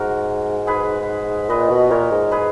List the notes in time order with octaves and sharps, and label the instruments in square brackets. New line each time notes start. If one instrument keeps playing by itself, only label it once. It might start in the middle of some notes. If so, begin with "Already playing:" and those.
Already playing: [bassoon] G#2 [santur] F#4 A#4
[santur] G#4 B4
[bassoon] A#2 [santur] B4 D#5
[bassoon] B2
[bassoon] A#2 [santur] A#4 C#5
[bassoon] G#2
[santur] G#4 B4